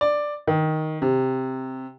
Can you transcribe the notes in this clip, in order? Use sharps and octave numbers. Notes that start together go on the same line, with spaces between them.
D5
D#3
C3